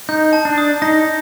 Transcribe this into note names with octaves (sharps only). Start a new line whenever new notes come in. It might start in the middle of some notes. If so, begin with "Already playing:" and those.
D#4 G6
A5
D4
D#6
D#4 A#6